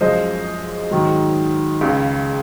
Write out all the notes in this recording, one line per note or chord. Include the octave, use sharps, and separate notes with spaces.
F#2 F3 G#3 C5 D#5
G#2 D#3 F#3
C#2 C#3 G#3